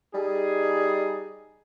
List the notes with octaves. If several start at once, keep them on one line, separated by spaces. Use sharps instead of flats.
G3 D#4 G#4